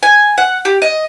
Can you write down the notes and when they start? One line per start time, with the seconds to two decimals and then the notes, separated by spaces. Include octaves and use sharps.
0.03 G#5
0.38 F#5
0.65 G4
0.82 D#5